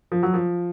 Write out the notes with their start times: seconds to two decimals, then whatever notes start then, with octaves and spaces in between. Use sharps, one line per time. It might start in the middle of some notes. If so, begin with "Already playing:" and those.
0.12 F3
0.23 F#3
0.34 F3